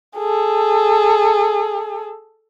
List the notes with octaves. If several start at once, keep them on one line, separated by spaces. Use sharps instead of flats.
G#4 A4